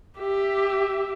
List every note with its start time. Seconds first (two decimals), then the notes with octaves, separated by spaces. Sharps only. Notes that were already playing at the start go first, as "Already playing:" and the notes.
0.19 G4 E5